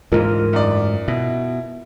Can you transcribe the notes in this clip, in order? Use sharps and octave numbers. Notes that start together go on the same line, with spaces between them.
D2 G#2 E3 F4 A#4 D#5
F#2 D#4 D5
B2 E4